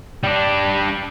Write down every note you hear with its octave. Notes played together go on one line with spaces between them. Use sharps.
G3 D4